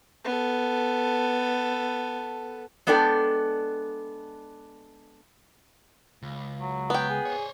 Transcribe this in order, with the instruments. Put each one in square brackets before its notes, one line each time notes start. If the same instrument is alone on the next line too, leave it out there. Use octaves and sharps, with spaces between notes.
[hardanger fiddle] B3 A4
[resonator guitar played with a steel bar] G#3 B3 D4 A4 D5 G5
[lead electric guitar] C#2
[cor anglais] F#3
[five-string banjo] B3 G5
[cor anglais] G#4
[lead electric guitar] C5 C#5